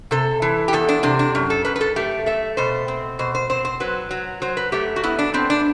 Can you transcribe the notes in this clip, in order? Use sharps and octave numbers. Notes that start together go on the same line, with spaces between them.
C3 A4
E3
G4
E2 A4
D4
C3 D4
D4
F#2
A4
F#2 B4
B4
A4
A3 G4
A3 E5
B2 C5
C4
B2 C5
C5
C4 C5
C5
F#3 B4
F#3
F#3 C5
B4
A3 G4
F#4
B3 E4
D4
B3 C4
D4